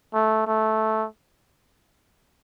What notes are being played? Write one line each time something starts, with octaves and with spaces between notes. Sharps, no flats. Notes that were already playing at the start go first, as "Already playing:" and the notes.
A3
A3